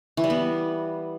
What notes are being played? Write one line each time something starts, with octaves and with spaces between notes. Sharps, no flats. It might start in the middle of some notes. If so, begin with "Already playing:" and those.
E3
G3
B3